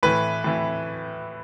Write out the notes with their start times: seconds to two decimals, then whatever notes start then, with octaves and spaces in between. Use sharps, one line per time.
0.03 A2 E3 B4
0.44 A2 E3